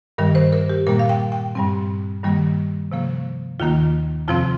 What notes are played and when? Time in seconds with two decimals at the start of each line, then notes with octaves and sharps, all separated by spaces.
0.18 G2 D#3 G3 A#4
0.35 C5
0.53 A#4
0.70 G4
0.87 A#2 G3 A#3 A#4
0.99 F5
1.09 G5
1.32 G5
1.55 G2 G3 C4
2.24 G2 D#3 G3 A#3
2.92 C3 F3 A#3
3.60 D#2 D#3 A#3 F4
4.28 F2 C3 F3 C4 F4